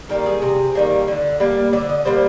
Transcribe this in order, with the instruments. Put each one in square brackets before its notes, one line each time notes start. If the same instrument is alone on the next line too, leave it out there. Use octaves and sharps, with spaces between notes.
[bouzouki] D#3 G3 A#3 A#4
G#4
C3
D#3 G3 A#3
D3
G3 A#3
D3 D5
D#5
G3 A#3 C5